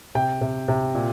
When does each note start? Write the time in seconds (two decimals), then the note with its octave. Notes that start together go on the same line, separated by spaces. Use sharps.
0.15 C3 G5
0.41 C3
0.68 C3
0.95 A#2